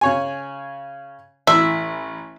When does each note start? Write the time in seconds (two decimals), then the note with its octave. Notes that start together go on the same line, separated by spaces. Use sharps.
0.01 C#3 C#5 G#5
1.47 A1 E4 E5